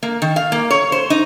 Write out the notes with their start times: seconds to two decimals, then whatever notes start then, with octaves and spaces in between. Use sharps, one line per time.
0.03 A#3
0.22 D#3
0.36 F5
0.52 A#3
0.70 C#5
0.92 C5
1.10 D#4